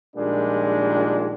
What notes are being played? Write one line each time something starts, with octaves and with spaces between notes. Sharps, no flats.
A#1 A#2 D#3 G3 G#3 D4